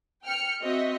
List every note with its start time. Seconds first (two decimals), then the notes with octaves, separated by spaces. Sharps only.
0.24 G5 F6 C#7
0.62 C4 F#4 D#5 E5